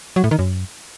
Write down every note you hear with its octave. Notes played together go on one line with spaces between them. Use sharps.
F#3
A2
D#3
F#2